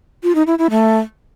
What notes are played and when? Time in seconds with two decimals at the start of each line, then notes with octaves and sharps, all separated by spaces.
0.23 F4
0.35 D#4
0.47 E4
0.59 E4
0.70 A3